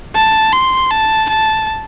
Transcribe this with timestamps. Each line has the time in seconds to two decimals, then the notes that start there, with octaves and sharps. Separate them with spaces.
0.15 A5
0.53 C6
0.90 A5
1.29 A5